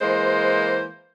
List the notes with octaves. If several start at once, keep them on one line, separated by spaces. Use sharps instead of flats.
E3 G#3 A#3 C5